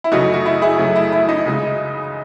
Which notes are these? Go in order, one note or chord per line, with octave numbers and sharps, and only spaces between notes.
E4
F#2 C#3 F#3 A3 D#4 F#4
F#4
E4
E4 G#4
F#2 C#3 F#3 A3
E4
E4
D#4
C#2 C#3 G#3